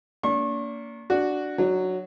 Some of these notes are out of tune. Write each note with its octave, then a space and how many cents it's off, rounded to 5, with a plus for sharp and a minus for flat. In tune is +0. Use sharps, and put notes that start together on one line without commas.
A#3 -15 D4 -40 C#6 -35
D4 +0 F#4 +0
F#3 +0 D4 +40